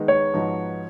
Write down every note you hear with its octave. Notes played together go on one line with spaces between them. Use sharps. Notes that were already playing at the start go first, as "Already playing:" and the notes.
Already playing: D#3 G#3 B3 D#4
C#5
G#2 F3 B3 D#4 F#4